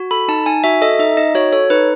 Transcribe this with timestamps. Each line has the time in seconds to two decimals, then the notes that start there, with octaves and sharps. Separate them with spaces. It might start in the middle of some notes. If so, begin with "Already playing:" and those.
Already playing: F#4
0.11 A4 B5
0.28 D#4 A5
0.46 D#4 G#5
0.64 F#4 E5
0.82 A4 D#5
0.99 D#4 E5
1.17 D#4 D#5
1.35 F#4 C#5
1.52 A4 C#5
1.70 D#4 B4